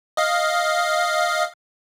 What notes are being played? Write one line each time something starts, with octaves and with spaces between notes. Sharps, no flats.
D#5 F5